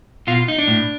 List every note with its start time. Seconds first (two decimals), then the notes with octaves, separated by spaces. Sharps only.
0.27 B2 F4
0.48 D#4
0.58 D4
0.68 A2